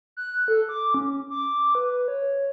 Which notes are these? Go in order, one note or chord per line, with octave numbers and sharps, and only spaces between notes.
F#6
A4
D6
C#4
D6
B4
C#5